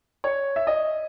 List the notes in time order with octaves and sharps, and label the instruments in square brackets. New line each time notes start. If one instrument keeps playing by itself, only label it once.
[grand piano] C#5
E5
D#5